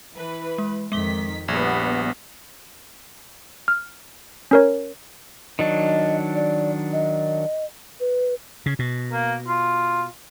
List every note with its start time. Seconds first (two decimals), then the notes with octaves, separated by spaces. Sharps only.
0.13 E3 B4
0.58 G#3
0.92 F2 D#3 G#3 D6 B6 G7
1.48 A#1 G3 B3 G#6
3.68 F6
4.51 C#4 A#4 C#5
5.59 D#3 F#3 D4 D#5
6.35 D5
6.93 D#5
8.00 B4
8.66 C#3
8.79 B2
9.13 A#3
9.48 F4